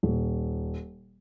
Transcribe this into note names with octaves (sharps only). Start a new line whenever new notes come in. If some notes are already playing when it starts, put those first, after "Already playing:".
D#1